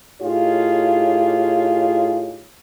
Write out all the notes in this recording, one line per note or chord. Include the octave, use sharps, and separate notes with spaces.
A2 D#4 F4 G4 G#4 C#5